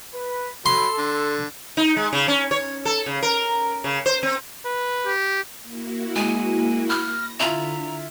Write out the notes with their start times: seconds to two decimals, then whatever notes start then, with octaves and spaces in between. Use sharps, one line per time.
0.14 B4
0.66 F#3 A4 B5 C6
0.99 D3
1.77 D#4
1.96 G#3
2.13 C#3
2.28 C#4
2.51 C#5
2.85 A4
3.06 C#3
3.22 A#4
3.84 C#3
4.06 C5
4.23 C4
4.65 B4
5.06 G4
5.62 A#3 E4 F#4
6.16 G#3 G#5
6.89 B5 F6 A#6
7.40 D3 E4 F4 E5 A#5